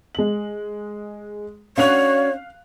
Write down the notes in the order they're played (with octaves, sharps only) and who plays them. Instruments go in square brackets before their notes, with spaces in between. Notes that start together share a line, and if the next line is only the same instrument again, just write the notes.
[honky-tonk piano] G#3 F#7
[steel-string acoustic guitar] C#4 D4 F#4 [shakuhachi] C#5 [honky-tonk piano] F5 F#6 F7